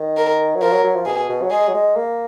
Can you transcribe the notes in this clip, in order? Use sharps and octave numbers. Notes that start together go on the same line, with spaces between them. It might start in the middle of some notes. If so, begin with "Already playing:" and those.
Already playing: D#3
A#4
F#3
F3 A#4
F#3
F#3
F3
B2 G#4
B2
F#3
G#3 G#4
F#3
G#3
A#3